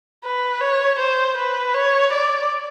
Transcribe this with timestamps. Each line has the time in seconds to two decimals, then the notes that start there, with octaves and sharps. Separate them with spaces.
0.24 B4
0.61 C#5
0.99 C5
1.37 B4
1.74 C#5
2.13 D5